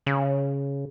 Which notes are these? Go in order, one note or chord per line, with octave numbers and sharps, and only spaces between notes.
C#3